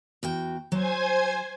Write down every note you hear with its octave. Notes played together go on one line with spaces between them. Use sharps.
E2 F#4 G5
F#3 C5 G#5 G#6